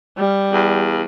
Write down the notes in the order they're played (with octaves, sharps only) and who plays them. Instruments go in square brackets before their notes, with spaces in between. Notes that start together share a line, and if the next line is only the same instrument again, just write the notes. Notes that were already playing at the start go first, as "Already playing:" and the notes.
[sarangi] G3
[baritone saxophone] E2